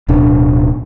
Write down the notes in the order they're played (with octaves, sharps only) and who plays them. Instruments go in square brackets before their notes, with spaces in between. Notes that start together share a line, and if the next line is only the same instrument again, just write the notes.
[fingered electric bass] D1 B2 D4